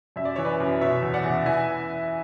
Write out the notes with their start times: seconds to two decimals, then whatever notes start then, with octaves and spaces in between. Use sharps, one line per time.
0.16 F#2 E5
0.25 D5
0.36 E3 C#5
0.45 B4 D5
0.60 F#2
0.81 B2 C#5 E5
1.02 E2
1.14 D5 F#5
1.24 E2
1.46 E3 E5 G#5